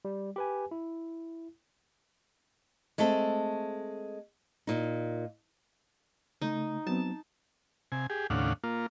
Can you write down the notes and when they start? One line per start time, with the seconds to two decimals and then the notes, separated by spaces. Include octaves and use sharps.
0.05 G3
0.36 G4 B4 G#5
0.71 E4
2.98 G#3 A3 C4 A4
4.67 A#2 D#4
6.42 C#3 A3 D#4
6.87 F#3 B3 C4 A5
7.92 C3 G#5
8.10 G4 G#4
8.30 D#2 A2 C#3 D4 F5 F#5
8.64 A#3 F4